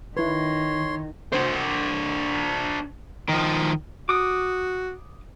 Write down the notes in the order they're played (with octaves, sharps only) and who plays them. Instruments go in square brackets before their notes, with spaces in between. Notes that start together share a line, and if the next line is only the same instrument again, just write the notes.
[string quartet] D#3 [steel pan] E4 B4 [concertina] C#5 C6
[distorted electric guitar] D4 C5
[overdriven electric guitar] D#3 F3
[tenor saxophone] F#4 [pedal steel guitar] D6 D#6